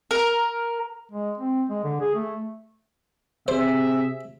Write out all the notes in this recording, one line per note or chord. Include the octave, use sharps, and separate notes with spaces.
A#4
G#3
C4
G#3
D3
G#4
A3
C3 G#4 C5 E5